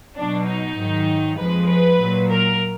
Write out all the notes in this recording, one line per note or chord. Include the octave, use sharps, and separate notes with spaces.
B2 F#3 D4
D#4
G#2 D#3 F#3
F2 F3 G#3 B4
B4
A#2 F#3
A#4